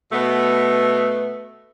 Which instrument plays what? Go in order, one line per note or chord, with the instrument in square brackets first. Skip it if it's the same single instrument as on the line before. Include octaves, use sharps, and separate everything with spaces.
[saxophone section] B2 A3 B3